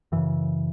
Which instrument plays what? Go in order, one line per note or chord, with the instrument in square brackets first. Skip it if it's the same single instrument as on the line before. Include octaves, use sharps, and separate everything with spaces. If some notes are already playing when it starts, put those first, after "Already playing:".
[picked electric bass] F#2 C#3 E3